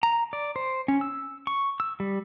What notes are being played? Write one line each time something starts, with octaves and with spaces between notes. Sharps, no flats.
A#5
D5
C5
C#4
E6
C#6
E6
G3